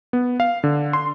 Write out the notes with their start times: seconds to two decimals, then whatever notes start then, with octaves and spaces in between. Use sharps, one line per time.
0.13 B3
0.40 F5
0.64 D3
0.93 C6